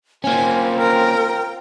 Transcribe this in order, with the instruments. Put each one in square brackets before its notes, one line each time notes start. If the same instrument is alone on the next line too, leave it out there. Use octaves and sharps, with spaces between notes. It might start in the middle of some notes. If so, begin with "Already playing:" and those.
[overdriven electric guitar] A#3 C#4 [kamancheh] C4 F4 [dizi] G#5
[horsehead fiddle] A#4 [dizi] G5